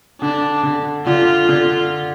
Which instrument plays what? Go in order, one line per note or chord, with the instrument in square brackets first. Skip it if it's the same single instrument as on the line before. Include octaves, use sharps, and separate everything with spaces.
[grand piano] D3 [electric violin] D4
[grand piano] D3
[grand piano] D3 [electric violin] F4
[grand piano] D3